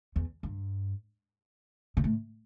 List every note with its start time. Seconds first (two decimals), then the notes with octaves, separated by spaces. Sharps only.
0.16 E2
0.43 G2
1.97 B2
2.04 A2